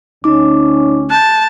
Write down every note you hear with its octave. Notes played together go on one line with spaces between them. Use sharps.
D2 C#4 D#4 D6
A5 F#6 G6